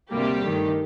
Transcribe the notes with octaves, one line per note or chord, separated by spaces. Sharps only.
D2 C3 G3 A#3 G4
G2 D#3 A3